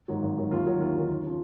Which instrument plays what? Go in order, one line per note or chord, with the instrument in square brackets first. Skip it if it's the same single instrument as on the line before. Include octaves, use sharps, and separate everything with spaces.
[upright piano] G#2 D#3 F#3
G#1
G#2 D#3 F#3
D#2 F4
D#3 F#3
D#2 F4
D#3 F#3
D#2
C#3 F3